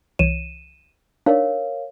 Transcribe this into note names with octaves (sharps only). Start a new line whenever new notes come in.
C2 E3 C#5 D#7 E7
D4 D#4 A#4 C#5 D5 F5